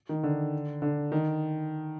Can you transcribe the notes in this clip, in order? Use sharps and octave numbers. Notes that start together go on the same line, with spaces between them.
D#3
D3
D3
D#3